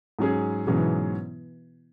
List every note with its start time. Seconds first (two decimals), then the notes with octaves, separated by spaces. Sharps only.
0.19 G#2 F#3 C#4 G#4
0.67 G#2 B2 E3 F#3 C#4 G#4